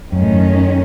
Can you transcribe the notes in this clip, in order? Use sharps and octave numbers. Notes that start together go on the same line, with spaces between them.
F#2 D#3 A3 C#4
A2
F#2